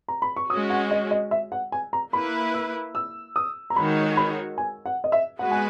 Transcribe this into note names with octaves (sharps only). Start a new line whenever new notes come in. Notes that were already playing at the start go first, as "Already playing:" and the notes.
A#5
B5
C#6
G#3 C#4 F#4 D#6
F#5
D#5
D#5
E5
F#5
G#5
A#5
A#3 E4 B4 B5
E6
E6
D#6
A#5
D#3 G#3 D#4 F#4 C#5 B5
B5
G#5
F#5
D#5
E5
G#3 B3 F#4 B4 F#5
G#5